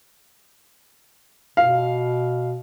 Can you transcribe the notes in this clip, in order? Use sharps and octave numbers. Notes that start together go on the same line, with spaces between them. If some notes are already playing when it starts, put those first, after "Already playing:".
B2 F5